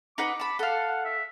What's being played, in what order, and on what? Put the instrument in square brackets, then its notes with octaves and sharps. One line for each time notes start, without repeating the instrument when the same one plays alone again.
[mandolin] D#4 B4 F#5 [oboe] D6
[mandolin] A5 B5
[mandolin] A4 F5 [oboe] F#5
[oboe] F#5
E5